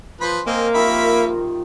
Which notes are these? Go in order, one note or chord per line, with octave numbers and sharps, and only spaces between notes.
F3 B4 C5 B5
A#3 C4 A#4 D#5 G#5
C3 D#3 F3 E5 B5